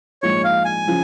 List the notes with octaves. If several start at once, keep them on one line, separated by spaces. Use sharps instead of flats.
A#1 G#2 F3 G#3 C#5
F5
G#5
C#3 F3